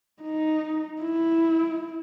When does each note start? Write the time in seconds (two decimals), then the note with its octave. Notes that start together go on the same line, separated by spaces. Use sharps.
0.22 D#4
1.02 E4